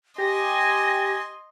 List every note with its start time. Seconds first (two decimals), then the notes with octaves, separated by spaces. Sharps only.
0.18 G4 D#5 G#5 C6 A#6